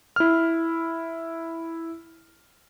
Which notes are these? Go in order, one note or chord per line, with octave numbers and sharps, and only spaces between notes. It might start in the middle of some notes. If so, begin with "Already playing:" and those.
E4 F6